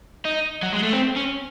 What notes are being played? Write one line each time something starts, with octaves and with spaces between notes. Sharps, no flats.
D#4
F#3
G#3
A3
C4
C#4